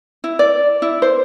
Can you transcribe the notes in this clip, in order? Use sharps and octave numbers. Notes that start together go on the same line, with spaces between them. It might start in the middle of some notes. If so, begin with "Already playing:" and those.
E4
D5
E4
C5